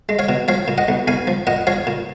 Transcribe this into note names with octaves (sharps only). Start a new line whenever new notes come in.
G#3
C#5 F5
B2
F3 C#5 F5
A#2
D#5 F#5
B1
B1 F5 G#5
F3
A#2 D#5 F#5
F3 C#5 F5
A#2